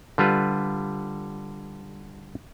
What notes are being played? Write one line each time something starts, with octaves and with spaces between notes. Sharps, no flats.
D3 G3 F4 B4